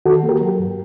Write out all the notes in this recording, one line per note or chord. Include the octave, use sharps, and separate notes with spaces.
D#3 F#4 A4
A#3
G4 A#4
F#3
G2